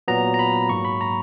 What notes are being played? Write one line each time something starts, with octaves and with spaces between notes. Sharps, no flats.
A#2 F#3 B3 A#5
A#5
B5
G#2 F#3 A#3 C#6
B5
A#5